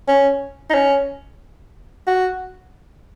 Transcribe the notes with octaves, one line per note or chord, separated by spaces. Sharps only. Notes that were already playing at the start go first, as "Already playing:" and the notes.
C#4
D#4
C#4
F#4